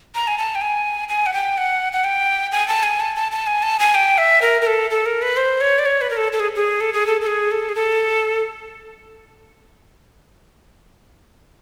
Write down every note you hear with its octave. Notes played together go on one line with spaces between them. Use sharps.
A#5
G#5
A5
G5
G#5
G#5
F#5
G5
F#5
F#5
G5
G#5
A5
G#5
A5
A5
A5
G#5
A5
G#5
G5
E5
A#4
A#4
A4
A4
A#4
B4
C5
C#5
D5
C#5
B4
A#4
A4
A4
G#4
G#4
A4
G#4
A4
A4
G#4
A4
G#4
A4